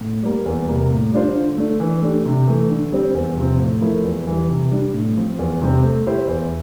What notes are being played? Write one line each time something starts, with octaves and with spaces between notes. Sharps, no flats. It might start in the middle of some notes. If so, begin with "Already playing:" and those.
A2
G3 A#3
E2
C3 G3 A#3
A2
G3 D4 F4 C5
D3
A3 D4
E3
A3 D4 G4
C3
E3 A3
D3
G3 C4 G4 C5
E2
C3 F3 C4
A2
F3 A3 E4 A#4
E2
E3 G3
C3
G3 D4
A2
F3 C4
E2
C3 G3 C4 G4
A3
E4 G4 C5 E5
E2